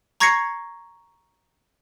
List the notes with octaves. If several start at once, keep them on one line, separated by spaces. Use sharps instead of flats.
A#5 C#6 G#6 A#6 C7 C#7